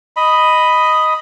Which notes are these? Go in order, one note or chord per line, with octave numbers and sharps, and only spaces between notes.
D#5 B5